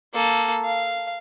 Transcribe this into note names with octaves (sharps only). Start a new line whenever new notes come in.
A#3 A4
F5